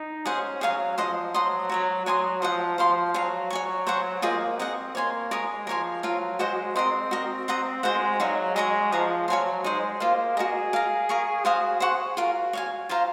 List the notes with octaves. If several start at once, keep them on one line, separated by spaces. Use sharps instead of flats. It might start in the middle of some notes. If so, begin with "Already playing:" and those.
Already playing: D#4
C#4 G#4 C5 F#5
F#3 G#4 C#5 F5 G#5
F3 C5 D#5 F#5 C6
F#3 C5 F#5 C6 D#6
F#3 F#4 A#4 C#5
F#3 C#5 G#5 C6 D#6
F3 C5 D#5 F#5
F3 C5 F5 C6
F#3 G#4 C#5 F5
C#5 G#5 C#6
G#4 C5 F#5 C#6
A#3 F4 G#4 C5 D#5
C4 G#4 D#5 F#5
A#3 C#5 G#5 C6
G#3 A#4 C#5 G#5 D#6
F3 A#4 C#5 G#5 C6
F#3 F4 A#4 F5
G#3 F#4 C5 D#5 F#5
C4 A#4 D#5 F#5 C6
F#4 A#4 D#5
C5 F#5 A#5 D#6
G#3 F#4 C5 F#5
F#3 D#4 F#4 C#5 F5
G#3 G#4 D#5 A#5 C#6
F3 G#4 C#5 F#5 A#5
F#3 C#5 F5 G#5 C6
G#3 D#4 G#4 C5
A#3 F4 C5 F5
F#4 G#4 A#4 D#5
A#4 F5 A#5
A#4 F5 G#5 C#6
F#4 C5 F5 G#5 D#6
G#4 C5 F#5 C#6
F4 F#4 A#4 F5
C#5 F5 G#5
F4 C5 F5 A#5